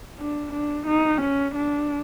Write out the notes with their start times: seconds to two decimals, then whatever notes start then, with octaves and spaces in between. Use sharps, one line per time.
0.19 D4
0.53 D4
0.87 D#4
1.21 C#4
1.55 D4